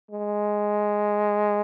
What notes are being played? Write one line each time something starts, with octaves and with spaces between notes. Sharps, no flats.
G#3